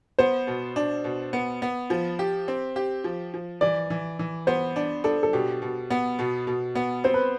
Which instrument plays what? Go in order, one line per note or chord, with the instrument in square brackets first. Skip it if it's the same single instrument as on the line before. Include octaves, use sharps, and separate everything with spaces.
[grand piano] B3 [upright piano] C5
[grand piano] B2
D4
B2
B3
B3
F3
G4
C4
G4
F3
F3
[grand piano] E3 [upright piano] D5
[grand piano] E3
E3
[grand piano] B3 [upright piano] C5
[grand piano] D4
[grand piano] D4 [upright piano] A4
[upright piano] A4
[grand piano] B2 [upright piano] G4
[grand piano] B2
B3
B2
B2
B3
[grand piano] C4 [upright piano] C5
[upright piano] B4